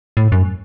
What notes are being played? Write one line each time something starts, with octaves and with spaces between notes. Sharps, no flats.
A2
F#2